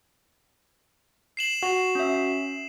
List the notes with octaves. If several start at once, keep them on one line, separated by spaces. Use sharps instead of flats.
C7 E7 F#7
F#4
C#4 E5